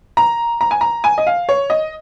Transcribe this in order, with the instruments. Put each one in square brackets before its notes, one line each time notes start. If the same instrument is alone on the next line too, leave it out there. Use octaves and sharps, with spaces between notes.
[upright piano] A#5
A#5
G#5
A#5
G#5
D#5
F5
C#5
D#5